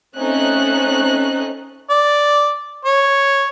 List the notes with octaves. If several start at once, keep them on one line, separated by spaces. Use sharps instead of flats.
A3 C4 C#4 D#4 F#6
D5
C#5